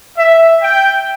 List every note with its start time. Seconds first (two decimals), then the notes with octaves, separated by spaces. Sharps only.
0.17 E5
0.62 G5